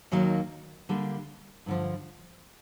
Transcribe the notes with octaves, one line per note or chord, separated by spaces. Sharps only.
D#2 D#3 F#3 A#3 D#4
D3 G3 A#3
G2 D3 F3